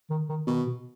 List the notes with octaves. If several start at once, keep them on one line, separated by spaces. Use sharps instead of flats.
D#3
D#3
B2 D#3
B2